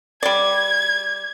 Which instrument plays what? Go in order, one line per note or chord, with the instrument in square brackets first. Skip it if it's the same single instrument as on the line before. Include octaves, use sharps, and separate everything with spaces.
[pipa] G3 D5 [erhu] G#6